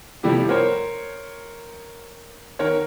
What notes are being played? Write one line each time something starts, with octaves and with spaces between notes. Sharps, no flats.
C3 F3 G3 A3 E4 G4
A#4 C5 C#5
D#3 A#4 C#5